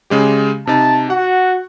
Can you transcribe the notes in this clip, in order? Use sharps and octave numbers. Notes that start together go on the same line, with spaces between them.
C#3 G#3 G4
C3 D#4 A5
F#4 F#5